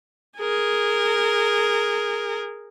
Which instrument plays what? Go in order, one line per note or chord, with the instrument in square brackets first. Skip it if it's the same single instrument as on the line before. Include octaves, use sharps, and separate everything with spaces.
[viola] G#4 A#4